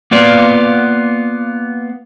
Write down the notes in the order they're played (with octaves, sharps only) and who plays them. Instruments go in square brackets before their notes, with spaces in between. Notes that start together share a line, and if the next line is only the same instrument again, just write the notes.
[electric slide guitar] A#3 B3 F4 D5